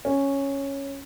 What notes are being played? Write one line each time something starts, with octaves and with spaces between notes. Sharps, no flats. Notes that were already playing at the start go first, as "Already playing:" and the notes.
C#4